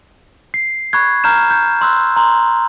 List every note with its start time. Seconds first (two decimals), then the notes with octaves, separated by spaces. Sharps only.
0.54 C7
0.93 B5 C#6 F#6 G#6
1.24 A#5 F6 G6 E7
1.51 G6
1.81 C6 E6 F#6
2.16 A#5 C6